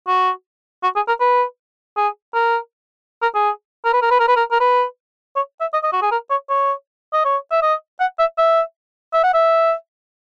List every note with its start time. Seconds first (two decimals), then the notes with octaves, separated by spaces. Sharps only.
0.07 F#4
0.83 F#4
0.96 G#4
1.08 A#4
1.20 B4
1.97 G#4
2.34 A#4
3.22 A#4
3.35 G#4
3.85 A#4
3.93 B4
4.02 A#4
4.11 B4
4.20 A#4
4.28 B4
4.36 A#4
4.52 A#4
4.60 B4
5.36 C#5
5.61 E5
5.73 D#5
5.83 D#5
5.93 F#4
6.02 G#4
6.11 A#4
6.30 C#5
6.49 C#5
7.13 D#5
7.25 C#5
7.51 E5
7.62 D#5
8.00 F#5
8.19 E5
8.38 E5
9.13 E5
9.24 F#5
9.34 E5